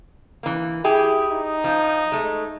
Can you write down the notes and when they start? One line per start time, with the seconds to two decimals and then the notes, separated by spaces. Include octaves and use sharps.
0.43 E3 A#3
0.84 E4 G4 G#4
1.28 D#4
1.64 F3
2.12 G#3 A3